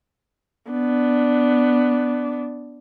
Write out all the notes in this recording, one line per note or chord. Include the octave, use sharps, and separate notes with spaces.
B3 D4